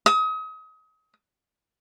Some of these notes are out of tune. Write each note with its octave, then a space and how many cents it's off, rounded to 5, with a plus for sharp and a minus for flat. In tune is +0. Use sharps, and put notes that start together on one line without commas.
D#6 +35